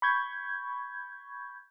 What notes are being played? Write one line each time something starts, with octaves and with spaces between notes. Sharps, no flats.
B5 C#6 G6 G#6